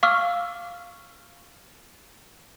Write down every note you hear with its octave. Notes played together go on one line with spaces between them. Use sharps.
F5 C#6 D6 E6 F6